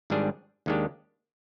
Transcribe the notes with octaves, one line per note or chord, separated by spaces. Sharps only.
G#1 G#2 G3 D4 G#4
D#2 D#3 G#3 D4 G4